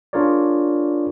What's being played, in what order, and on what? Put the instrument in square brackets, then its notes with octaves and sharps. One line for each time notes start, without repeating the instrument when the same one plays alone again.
[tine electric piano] D4 F4 G#4 A#4 C#5 D5